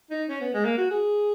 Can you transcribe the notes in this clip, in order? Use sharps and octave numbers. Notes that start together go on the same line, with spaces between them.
D#4
C#4
B3
G#3
A#3
F#4
G#4